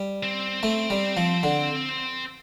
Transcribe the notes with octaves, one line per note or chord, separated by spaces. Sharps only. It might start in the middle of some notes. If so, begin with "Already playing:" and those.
Already playing: G3
C4
A3
G3
F3
D3